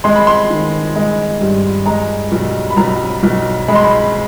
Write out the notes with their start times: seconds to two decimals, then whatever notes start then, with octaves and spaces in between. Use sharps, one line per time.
0.04 G#3 C6
0.16 B5
0.27 C6
0.50 D#3
0.96 G#3
1.41 G2
1.86 G#3 A#5
2.32 B1
2.70 B5
2.77 B1 A#5
3.23 B1
3.68 G#3 B5
3.75 C6
3.83 B5